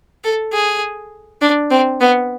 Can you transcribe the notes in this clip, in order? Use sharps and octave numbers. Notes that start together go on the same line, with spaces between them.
A4
G#4
D4
C4
B3